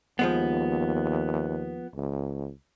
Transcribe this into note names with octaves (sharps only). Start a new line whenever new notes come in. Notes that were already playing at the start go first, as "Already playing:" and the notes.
D#2 F3 G#3 B3
C#2